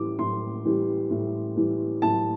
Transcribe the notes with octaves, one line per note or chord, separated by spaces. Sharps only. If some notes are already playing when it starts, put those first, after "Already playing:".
Already playing: A2 E3 G3 D6
A2 C6
E3 G3
A2
E3 G3
A2 A5